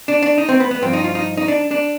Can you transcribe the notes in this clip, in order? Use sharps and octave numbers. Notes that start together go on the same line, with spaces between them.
D4
D4
D#4
C4
B3
B3
G2 F3 C4
D#4
F4
D#4
D#4
D4
D4